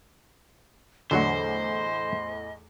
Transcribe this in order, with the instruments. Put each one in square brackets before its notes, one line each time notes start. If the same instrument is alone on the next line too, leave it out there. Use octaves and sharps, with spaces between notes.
[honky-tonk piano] E2 A2 [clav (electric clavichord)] D3 F#3 F#4 [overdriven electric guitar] C5 [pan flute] D#5